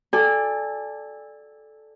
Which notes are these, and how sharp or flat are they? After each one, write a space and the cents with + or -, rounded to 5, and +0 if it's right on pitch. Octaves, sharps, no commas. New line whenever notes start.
A4 -10 D5 +5 G#5 -30